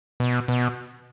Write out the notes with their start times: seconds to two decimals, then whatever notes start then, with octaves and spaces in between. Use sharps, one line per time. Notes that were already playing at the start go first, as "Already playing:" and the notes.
0.20 B2
0.48 B2